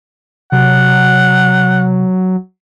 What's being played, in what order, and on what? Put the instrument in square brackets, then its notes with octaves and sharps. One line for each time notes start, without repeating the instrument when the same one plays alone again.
[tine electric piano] C3 [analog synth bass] F#3 [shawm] F#5